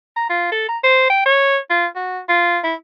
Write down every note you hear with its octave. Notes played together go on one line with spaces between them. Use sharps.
A#5
F4
A4
A#5
C5
G5
C#5
F4
F#4
F4
E4